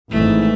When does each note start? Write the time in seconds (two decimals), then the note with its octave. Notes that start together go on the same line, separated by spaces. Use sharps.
0.11 G#1 G#2 E3 A3